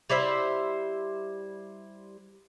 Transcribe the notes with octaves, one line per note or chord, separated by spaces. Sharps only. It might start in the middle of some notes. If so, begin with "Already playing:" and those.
G3 E4 C5 E5